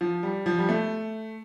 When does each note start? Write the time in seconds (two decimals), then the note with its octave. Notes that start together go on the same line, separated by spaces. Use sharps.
0.01 F3
0.23 G3
0.46 F3
0.59 G3
0.69 A3